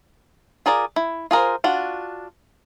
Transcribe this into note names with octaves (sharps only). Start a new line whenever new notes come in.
F4 G#4 A#4 D5
E4
F4 G#4 A#4 C5
D4 F4 F#4